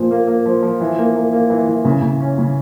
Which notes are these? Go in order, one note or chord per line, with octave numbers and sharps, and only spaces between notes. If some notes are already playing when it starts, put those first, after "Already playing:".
Already playing: A#2 F3
A#3
A#3
F3
F3
E3
A#3
A#3
A#3
E3
E3
C#3
C#3
C#4
C#3